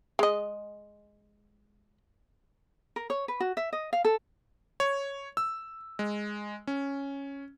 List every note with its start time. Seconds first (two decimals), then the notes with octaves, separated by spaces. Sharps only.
0.19 G#3 D#5
2.96 A#4
3.10 C#5
3.28 B4
3.40 F#4
3.57 E5
3.73 D#5
3.93 F5
4.05 A4
4.80 C#5
5.37 E6
5.99 G#3
6.67 C#4